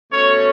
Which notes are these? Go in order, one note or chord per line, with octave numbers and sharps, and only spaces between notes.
B2 A3 C#4 C#5